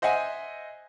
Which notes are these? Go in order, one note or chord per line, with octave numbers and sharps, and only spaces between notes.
C5 D#5 E5 F#5 G#5